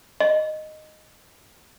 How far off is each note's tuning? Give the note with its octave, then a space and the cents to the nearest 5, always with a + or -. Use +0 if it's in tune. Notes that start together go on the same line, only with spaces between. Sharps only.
D#5 -10